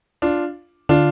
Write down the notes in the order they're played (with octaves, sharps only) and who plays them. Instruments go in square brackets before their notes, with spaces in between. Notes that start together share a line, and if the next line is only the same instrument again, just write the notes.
[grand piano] D4 F4
[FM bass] D3 [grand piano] D4 F4